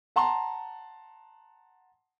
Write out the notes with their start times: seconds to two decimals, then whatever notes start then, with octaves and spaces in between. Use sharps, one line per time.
0.16 F#5 A5 A#5 C6